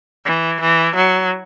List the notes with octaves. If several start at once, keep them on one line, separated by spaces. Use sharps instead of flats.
E3
E3
F#3